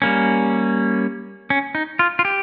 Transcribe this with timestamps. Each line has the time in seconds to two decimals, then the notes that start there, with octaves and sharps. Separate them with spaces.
0.02 G3 A#3 C#4
1.50 C#4
1.75 D#4
1.99 F4
2.19 F4
2.25 G4